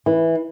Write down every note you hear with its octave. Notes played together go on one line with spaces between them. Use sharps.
E3